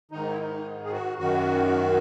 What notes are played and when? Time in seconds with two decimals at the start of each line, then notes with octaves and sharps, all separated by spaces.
0.11 G#2 D#3 D#4
0.30 E4
0.38 D#4
0.84 G#4
0.92 F#4
1.18 F#2 D#3 F#4